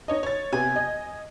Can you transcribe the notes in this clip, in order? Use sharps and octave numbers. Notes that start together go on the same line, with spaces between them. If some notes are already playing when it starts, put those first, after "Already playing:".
D#4 C#5 D#5
C#5 A6
C3 B3 G#5
D#5